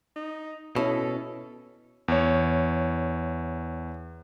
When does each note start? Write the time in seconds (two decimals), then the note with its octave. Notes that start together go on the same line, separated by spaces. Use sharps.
0.16 D#4
0.76 B2 C#4 E4 A4 A5
2.08 E2 C#5